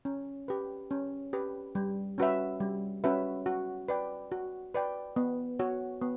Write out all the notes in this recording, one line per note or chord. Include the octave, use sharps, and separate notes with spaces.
C#4
G4 B4
C#4
G4 B4
G3
C#4 F#4 B4 E5
G3
C#4 F#4 B4 E5
F#4
B4 D5 G5
F#4
B4 D5 G5
B3
F#4 C#5
B3